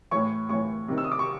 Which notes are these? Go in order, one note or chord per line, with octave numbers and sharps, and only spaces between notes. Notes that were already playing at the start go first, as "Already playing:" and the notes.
A2 E3 C#5 C#6
A2 E3 C#5 C#6
C3 D#3
E6
D#6
D6
C#6